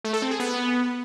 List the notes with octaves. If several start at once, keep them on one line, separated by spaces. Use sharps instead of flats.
A3
A4
C4
G#4
B3